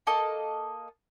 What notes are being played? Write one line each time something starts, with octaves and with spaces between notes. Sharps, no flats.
A#3 A4 D#5